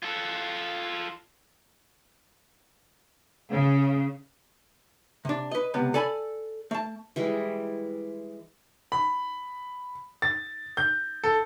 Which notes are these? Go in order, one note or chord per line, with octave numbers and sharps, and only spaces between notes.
F4 A4
C#3
C3 D4
B4 D#5
C#2 C3 B3
A4 D5 G#5 B5
A3 A5
E3 G3 G#3
B5
A6
G6
A4